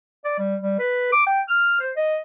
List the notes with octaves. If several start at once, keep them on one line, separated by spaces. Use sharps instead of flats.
D5
G3
G3
B4
D6
G5
F6
C5
D#5